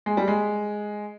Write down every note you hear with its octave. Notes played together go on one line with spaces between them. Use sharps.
G#3
G3
G#3